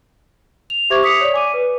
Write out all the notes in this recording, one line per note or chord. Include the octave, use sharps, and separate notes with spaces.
F7
G4 C5 E5 C#6 D6 G#6
D6 D#6 B6 C#7 F7
C#5 D5
G#5 D6 D#7
B4